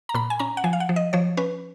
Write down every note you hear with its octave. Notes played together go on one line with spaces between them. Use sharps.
A#5
A#2 B5
G#5
C#4 A#5
F#5
F3 G#5
F5
F#5
F3
D#5
F3 C#5
C#4 B4